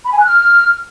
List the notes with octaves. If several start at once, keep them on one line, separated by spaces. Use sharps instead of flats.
B5
G#5
F#6
F6